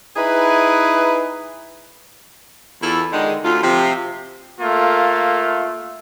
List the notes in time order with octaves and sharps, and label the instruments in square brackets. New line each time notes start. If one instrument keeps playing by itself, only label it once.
[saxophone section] D#4 E4 G#4 B4
E2 E4 F4 A4
D3 D#3 G#3
D2 F4
C3 F3
[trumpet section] A3 A#3 F4